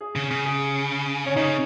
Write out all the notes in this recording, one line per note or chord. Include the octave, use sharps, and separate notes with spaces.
G#4
C#3
C#3
G#4
C#4
C#3 D#4